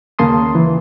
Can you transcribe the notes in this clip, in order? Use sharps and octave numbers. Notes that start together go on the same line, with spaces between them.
D#2 C#3 A#3 A5 C6 D#6
E3